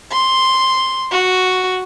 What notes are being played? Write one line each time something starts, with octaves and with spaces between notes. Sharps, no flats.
C6
F#4